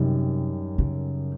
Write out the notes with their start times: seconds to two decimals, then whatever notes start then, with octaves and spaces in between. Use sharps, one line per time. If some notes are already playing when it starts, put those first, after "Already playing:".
Already playing: F#2 C3 D#3 G3
0.78 C#3